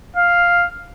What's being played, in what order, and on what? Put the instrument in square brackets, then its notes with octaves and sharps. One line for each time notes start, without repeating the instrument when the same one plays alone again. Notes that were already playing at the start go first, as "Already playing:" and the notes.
[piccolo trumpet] F5